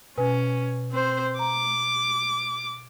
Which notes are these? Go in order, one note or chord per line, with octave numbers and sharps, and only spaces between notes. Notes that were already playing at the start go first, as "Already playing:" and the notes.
B2 C#4 B4 G#5
C4 C5
A#5 D6